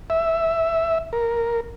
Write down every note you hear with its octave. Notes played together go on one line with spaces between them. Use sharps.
E5
A#4